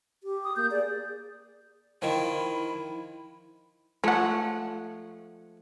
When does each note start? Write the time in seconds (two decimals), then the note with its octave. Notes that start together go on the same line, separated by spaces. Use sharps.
0.23 G4
0.44 D#6
0.56 A#3 G6
0.71 G#4 D5
2.02 D#3 F3 E4
4.04 F3 G#3 A3 C#5 F#5